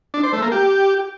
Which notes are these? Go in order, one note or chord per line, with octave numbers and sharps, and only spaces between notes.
D4
C5
A3
A#3
G4